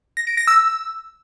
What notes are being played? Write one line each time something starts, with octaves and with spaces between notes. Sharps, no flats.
A#6
D7
A#6
E6